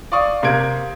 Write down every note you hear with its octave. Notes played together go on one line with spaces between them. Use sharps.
D5 F5 C#6 D#6
C3 A#3 G4 C6 G#6 D7